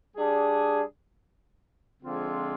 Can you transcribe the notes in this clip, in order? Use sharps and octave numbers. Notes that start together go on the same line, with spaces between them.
G3 D4 G#4
D3 F3 G#3 C4 F4